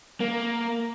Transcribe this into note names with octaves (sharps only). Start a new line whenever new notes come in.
A#3